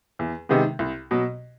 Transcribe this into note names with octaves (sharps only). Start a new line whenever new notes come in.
E2
C3 D#3 G#3 B3
C2
B2 F#3